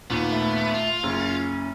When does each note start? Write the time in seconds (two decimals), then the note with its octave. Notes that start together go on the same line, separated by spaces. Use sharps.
0.10 D#2 A#2 B3
0.30 A3
0.74 F4
1.03 F#1 C#4